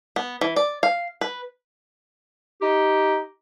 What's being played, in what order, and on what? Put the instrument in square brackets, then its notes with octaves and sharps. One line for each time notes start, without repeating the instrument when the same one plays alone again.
[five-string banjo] B3
E3
D5
F5
B4
[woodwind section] D#4 G4